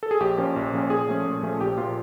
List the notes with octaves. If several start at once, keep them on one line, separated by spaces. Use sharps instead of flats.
A4
G#4
A#1 G4
A#2 F3 A#3 C#4
A#1
A#2 F3 A#3 C#4
A#2 G#4
F3 A3 C#4
A#2
F3 A3 C#4
A#1 G4
A#2 F3 A#3 F4